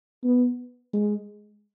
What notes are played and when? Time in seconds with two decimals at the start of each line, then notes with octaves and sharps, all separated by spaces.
0.23 B3
0.93 G#3